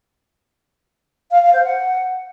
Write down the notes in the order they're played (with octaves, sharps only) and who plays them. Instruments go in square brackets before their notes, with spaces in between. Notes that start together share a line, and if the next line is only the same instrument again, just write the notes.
[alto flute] F5
F5
C5
F#5